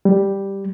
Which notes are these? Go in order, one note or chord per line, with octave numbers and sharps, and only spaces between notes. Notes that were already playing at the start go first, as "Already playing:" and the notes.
G3